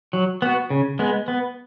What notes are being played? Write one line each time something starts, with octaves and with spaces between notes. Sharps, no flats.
F#3
B3 F#4
C#3
G#3 B3
B3